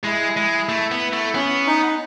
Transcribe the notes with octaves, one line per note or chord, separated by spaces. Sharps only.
G#3 E4
G#3
A3
B3
A3
B3 C#4
D#4